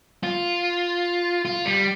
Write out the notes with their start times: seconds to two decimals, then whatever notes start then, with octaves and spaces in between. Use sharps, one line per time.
0.23 F4
1.45 F4
1.66 G3